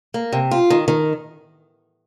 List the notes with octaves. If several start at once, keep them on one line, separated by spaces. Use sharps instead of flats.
A#3
C3
F4
D#3
D#3